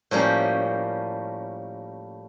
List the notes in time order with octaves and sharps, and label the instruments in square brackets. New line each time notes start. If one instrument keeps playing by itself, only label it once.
[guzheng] A2 F3 G3 A#3 C#4